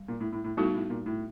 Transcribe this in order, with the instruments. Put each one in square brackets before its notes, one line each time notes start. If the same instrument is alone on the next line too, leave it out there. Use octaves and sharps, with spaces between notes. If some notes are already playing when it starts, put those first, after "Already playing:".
Already playing: [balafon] G3
[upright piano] A#2
A2
A2
A2
[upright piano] A2 [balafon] G3 B3 D#4 F#4 A4
[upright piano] A2
A#2
A2